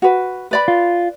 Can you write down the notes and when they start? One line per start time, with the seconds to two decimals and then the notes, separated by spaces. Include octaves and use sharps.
0.02 F#4 B4
0.51 B4 D5 B5
0.68 F4